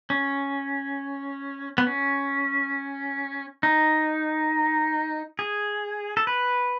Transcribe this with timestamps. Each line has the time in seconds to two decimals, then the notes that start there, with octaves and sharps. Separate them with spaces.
0.10 C#4
1.78 B3
1.87 C#4
3.63 D#4
5.39 G#4
6.17 A4
6.27 B4